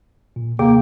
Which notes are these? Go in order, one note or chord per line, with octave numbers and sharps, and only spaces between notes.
A#2
D#2 C3 A#3 G#4 G5